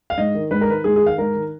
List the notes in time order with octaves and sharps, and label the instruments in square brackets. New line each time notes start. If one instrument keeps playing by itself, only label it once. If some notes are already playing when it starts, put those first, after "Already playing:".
[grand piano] F5
G#2 D#5
D#3
G#2 B4
A#4
D#3 B4
G#2 G#4
G#4
D#3 F5
G#2 A#4
D#3